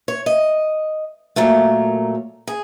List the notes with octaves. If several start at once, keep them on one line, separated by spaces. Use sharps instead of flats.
C#5
D#5
A#2 F#3 A3 A#4
G#4